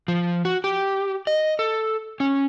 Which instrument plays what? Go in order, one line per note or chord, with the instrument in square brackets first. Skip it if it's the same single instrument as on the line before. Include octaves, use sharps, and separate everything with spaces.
[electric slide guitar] F3
F#4
G4
D#5
A4
C#4